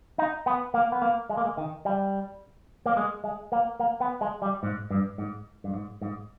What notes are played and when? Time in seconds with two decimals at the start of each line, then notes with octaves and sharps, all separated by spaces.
0.18 D#4
0.46 B3
0.74 A#3
0.92 B3
1.02 A#3
1.30 G#3
1.37 A#3
1.45 G#3
1.57 D#3
1.85 G3
2.86 A#3
2.97 G#3
3.24 G#3
3.52 A#3
3.80 A#3
4.00 B3
4.21 G#3
4.42 G3
4.63 G#2
4.90 G2
5.18 G#2
5.64 G2
5.74 G#2
6.02 G#2